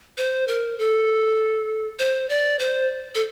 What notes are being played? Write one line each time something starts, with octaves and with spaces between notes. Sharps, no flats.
C5
A#4
A4
C5
D5
C5
A4